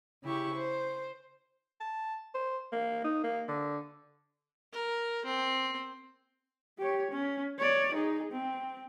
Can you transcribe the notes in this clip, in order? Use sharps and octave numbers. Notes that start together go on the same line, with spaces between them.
C#3 E4 G4 C#6
C5
A5
C5
A#3
D#4
A#3
D3
A#4
C4
G4 C#5
C#4
C#5 D5
D#4 G#4
C4